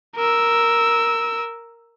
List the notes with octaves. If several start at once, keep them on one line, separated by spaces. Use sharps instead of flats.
A#4 E6